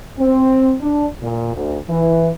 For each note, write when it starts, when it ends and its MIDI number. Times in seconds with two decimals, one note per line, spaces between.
0.19 0.74 60
0.81 1.06 62
1.22 1.54 46
1.55 1.77 38
1.89 2.29 52